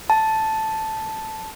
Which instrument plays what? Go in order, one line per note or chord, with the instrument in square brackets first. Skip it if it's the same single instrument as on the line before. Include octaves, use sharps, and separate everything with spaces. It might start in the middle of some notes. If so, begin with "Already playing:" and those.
[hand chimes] A5